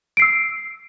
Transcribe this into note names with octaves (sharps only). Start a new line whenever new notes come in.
E6 C7 D7